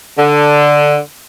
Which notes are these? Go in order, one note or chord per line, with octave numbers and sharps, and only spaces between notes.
D3